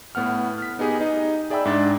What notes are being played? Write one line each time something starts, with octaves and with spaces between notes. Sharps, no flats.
A2 B3 F#5 F6
F6 B6
B3 D#4 G4 G#4
D#4 D#5
G#4 D5 E5 G5 B5 E6
G#2 D4 A6